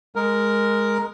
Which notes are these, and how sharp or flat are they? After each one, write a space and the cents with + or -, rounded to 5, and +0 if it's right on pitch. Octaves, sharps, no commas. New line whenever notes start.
G#3 +0 A#4 +0